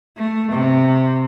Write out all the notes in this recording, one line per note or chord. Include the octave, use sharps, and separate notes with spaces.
A3
C3